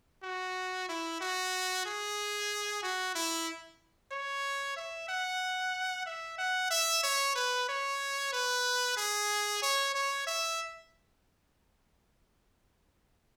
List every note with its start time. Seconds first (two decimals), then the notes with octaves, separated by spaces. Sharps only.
0.23 F#4
0.89 E4
1.21 F#4
1.86 G#4
2.83 F#4
3.15 E4
4.12 C#5
4.77 E5
5.09 F#5
6.06 E5
6.38 F#5
6.71 E5
7.03 C#5
7.36 B4
7.69 C#5
8.32 B4
8.97 G#4
9.62 C#5
9.95 C#5
10.27 E5